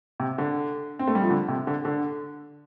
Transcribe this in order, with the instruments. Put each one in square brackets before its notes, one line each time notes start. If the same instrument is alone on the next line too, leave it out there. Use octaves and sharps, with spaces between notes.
[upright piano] C3
D3
C4
A3
G3
F3
D3
C3
D3
D3